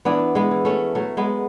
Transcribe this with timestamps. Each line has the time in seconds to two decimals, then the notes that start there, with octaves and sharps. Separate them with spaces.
0.05 E3 B3 D4
0.35 G#3 B3
0.51 E3
0.65 A3 C#4
0.95 F#3 A3
1.17 G#3 B3